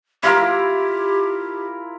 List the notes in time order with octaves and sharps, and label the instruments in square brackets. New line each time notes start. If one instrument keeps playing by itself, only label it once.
[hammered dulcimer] E4 F4 A#4 [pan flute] G4